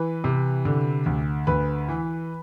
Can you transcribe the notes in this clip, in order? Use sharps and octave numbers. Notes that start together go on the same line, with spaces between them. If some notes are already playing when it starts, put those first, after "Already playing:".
Already playing: E3 B4
C3
D3
D2
D2 B4
E3